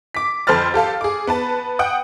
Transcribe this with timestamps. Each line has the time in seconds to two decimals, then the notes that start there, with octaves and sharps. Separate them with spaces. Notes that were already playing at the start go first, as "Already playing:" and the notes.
0.15 D6 B6
0.47 F2 A4 C5 B5 F6 A6
0.74 G4 A4 F5 A5
1.01 G#4 D6
1.27 B3 B4 A5
1.79 F#5 G5 D#6